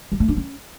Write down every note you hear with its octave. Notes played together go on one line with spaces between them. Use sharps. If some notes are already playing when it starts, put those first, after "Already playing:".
G3
A3
D4
C#4